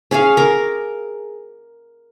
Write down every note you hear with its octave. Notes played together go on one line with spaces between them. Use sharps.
C#4 G#4 C#5 F5
A#4 D6